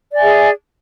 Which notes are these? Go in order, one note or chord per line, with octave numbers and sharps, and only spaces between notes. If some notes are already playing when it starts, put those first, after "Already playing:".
G#4 D5 E5 G#5